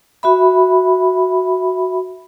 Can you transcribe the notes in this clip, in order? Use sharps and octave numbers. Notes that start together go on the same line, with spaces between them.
F#4 E5 B5